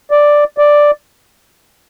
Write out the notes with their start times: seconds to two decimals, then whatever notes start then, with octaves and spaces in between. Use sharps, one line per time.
0.11 D5
0.58 D5